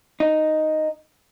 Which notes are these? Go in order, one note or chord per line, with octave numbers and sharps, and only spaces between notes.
D#4